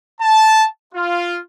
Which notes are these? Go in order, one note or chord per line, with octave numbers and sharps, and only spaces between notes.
A5
F4